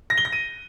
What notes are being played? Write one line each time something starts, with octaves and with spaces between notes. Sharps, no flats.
A#6
G7
A#6
D#7